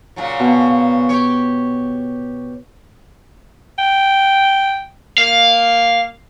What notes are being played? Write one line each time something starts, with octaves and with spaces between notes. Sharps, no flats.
A#2 C#3 F#3
B2
G4 C#5
G5
A#3 F5